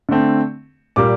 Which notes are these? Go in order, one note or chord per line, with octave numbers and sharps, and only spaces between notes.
D3 A3 C4
A#2 G3 A#3 D6